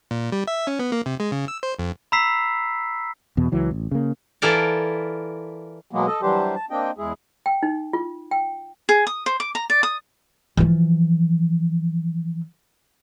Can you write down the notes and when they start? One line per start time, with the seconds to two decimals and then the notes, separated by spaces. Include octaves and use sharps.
0.11 A#2
0.32 G3
0.47 E5
0.67 C#4
0.79 B3
0.92 A#3
1.06 C3
1.20 G#3
1.32 C#3
1.48 E6
1.63 C5
1.79 F2
2.12 A#5 B5 E6 B6 C7
3.37 E2 B2
3.52 C#2 E3 F#3
3.71 A1
3.91 C#3 A#3
4.42 E3 E4 F4 A4 A#4 D5
5.91 B2 F#3 G#3 A#3 B3
6.07 A4 D#5
6.22 E3 F#3 G3 D4 G4 C5
6.55 A5
6.70 A#3 C4 D4 D#5 G5
6.98 E2 G#3 E4 G#4
7.46 G5
7.63 D#4
7.93 F4
8.31 G5
8.89 G#4
9.07 D#6
9.26 C5
9.40 D6
9.55 A#5
9.70 D5
9.83 D#6
10.57 E3 F3